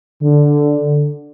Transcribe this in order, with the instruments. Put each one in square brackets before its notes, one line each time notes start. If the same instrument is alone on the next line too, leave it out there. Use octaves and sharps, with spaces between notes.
[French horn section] D3